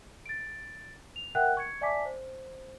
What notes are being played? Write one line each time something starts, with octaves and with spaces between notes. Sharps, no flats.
A6 D7
F7
A#4 E5 F#5 G5 F#6
C#6 G#6 C#7
D5 E5 G#5 A5 D6 B6
C5